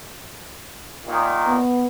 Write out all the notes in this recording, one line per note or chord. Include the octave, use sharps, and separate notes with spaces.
A#2 D#3
B3